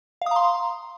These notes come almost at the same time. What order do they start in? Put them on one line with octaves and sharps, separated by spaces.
F5 D#6 A#5 C6